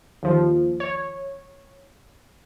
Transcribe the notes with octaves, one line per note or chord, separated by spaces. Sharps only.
D#2 F3
C#5